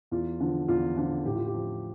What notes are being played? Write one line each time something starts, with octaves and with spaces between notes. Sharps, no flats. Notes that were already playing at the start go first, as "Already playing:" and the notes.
E2 F4
D3 F3
E2 F4
D3 F3 F4
A2 G4
F4
G4
F3